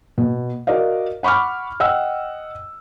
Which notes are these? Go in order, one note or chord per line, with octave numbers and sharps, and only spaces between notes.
B2
F#4 A#4 D5 D#5 F5
F#5 B5 C#6 D6 F6
D#5 F#5 G5 E6